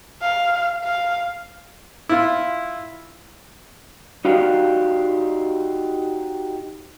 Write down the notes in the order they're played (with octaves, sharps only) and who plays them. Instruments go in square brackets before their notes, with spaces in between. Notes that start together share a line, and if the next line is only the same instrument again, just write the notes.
[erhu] F5
F5
[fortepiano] E4 F4
[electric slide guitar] D#4 F#4 G4 D5 F5